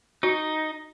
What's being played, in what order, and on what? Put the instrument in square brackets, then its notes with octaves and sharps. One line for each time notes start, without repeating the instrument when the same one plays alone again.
[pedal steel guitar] D#4 [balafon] F#4